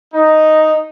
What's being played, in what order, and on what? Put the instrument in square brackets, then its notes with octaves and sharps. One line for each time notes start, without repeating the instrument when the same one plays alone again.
[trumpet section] D#4